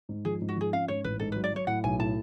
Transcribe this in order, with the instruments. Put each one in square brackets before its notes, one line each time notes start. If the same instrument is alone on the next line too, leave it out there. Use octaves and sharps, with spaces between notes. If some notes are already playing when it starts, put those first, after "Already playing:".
[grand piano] G#2
[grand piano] F3 [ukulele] G#4
[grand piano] G#2
[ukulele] F#4
[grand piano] F3 [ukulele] G#4
[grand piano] C#4 [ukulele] F5
[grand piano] G#2 [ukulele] C#5
[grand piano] A1 [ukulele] B4
[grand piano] G#2 [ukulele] A4
[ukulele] B4
[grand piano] F#3
[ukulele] D5
[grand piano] F#3 [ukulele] C#5
[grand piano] A2 [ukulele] F#5
[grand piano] B1 [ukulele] G#5
[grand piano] A2 [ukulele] A5